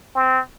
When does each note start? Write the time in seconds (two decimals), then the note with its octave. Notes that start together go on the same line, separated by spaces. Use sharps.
0.15 C4